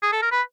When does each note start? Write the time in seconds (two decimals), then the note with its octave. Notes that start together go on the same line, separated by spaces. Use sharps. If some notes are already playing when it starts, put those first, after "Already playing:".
0.02 G#4
0.12 A4
0.22 A#4
0.32 B4